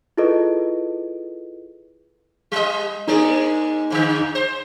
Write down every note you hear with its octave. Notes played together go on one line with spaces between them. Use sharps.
E4 F4 G#4 A4 B4 D#5
G3 D#5
G#3 A#3 D#4 G#4 D5
G#2 D3
C5